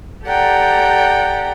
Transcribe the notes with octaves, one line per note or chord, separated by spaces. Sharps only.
G4 A4 D5 F#5 G5 A#5